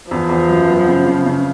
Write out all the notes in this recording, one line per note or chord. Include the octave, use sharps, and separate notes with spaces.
E2 F3
E2
F#2
B3
C#3
C#3
C#3